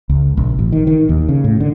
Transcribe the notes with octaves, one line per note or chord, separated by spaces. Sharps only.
C#2
A#1
A1
D#3
D#3
D#2
C#3
A2
D3